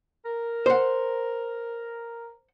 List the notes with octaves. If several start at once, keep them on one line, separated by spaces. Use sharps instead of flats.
A#4
C5 F#5